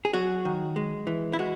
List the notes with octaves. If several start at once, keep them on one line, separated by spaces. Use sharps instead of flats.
G#4
F#3 F#4
D#3
G#3
E3
E4
G#3 F#4